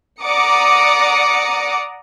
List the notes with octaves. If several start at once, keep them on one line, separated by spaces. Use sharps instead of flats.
D5 F#5 A#5 D6 D#6 C#7